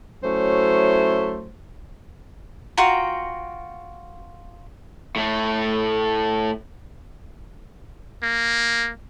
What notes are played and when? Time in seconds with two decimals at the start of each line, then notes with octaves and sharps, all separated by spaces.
0.23 F#3 A3 C#4 E4 C5
2.77 F4 F#4 G5 A#5
5.16 A2 A3
8.23 A#3